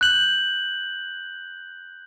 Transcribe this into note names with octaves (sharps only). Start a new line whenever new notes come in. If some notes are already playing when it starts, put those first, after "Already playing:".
F#6 G6 F#7